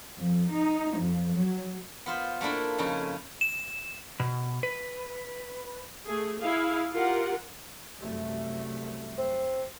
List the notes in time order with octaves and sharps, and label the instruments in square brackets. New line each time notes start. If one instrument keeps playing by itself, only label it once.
[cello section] F2
D#4
F2
F#3
[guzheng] B3 F4 C5
A3 A#3 D4 E4 F4
F2 C#3 C#4 D#4 E4
[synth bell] E7
[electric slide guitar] B2
B4
[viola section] A3 G#4
E4 G#4 F5
F4 G4 A#4 F#5
[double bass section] C2 F#2 A3
[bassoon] C4